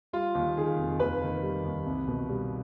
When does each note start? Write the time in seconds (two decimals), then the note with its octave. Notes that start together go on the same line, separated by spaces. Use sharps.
0.13 G3 F4
0.35 D#2
0.57 D#3 G#4
0.78 F1
1.00 D#2 B4
1.21 D#3
1.42 G3
1.65 D#2
1.86 C2
2.08 B2
2.29 G3